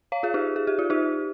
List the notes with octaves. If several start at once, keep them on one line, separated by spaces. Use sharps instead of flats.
C#5 F5
F4 G#4
D#4 G4
G#4
G4
F4
D#4 G4